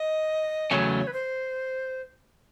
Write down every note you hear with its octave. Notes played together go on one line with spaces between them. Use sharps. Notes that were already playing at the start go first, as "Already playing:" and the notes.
Already playing: D#5
E2 C#3 F#3 A3 C#4 C#5
B4
C5